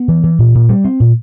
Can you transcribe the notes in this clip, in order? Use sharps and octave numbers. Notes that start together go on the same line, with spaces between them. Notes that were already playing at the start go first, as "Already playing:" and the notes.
Already playing: B3
E3
E3
A#2
A#2
G3
C4
A#2